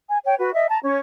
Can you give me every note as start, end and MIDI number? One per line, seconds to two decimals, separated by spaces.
0.08 0.18 80
0.25 0.35 73
0.25 0.35 79
0.38 0.51 66
0.38 0.51 71
0.54 0.66 75
0.54 0.66 76
0.70 0.79 81
0.70 0.79 82
0.83 0.99 61
0.83 0.99 73